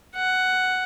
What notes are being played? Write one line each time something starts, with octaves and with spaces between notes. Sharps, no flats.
F#5